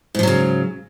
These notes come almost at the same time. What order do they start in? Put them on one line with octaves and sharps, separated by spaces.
G#2 F3 F#3 C#3